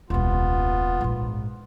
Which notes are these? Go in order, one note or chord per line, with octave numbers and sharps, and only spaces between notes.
D#1 C2 B3 F4
A#1 G#2